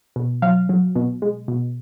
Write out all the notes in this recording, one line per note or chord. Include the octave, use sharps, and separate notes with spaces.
B2
F#3 F5
F#3
B2
G#3
B2